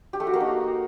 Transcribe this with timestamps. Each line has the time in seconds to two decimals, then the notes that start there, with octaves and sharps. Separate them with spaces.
0.13 G4
0.20 A3
0.27 F#4
0.34 A#3
0.40 D#4